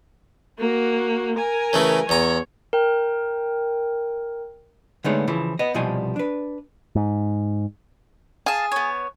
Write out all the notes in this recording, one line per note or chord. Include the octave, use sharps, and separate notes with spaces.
A#3 F#4
A#4 G#5
C#3 E3 A3
E2 C#5 A#5
A#4 G5
D3 G#3 A3 B3 D#4 C#5
C#3 E3 F3
B3 D#5
C2 B2 F3 G3 D#5 G#5
D4 B4
G#2
G#4 F5 A5
B3 C#5